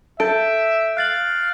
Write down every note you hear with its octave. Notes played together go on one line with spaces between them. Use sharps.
A4 E5 G6 D7
F5 F#6 A6 F#7